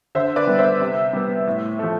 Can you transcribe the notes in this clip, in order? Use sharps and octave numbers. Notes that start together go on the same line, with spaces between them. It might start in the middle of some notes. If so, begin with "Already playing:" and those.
D3 C5 E5
B4 D5
G3 B3
C5 E5
C3
G3 B3
A2
F3 A3